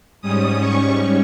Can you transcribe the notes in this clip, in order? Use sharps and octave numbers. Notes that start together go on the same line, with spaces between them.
G#2 G3 C#4 D#6
C#6